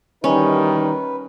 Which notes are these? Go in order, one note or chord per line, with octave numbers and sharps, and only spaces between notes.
B2 D#3 E3 G3 C#4 D#4 B4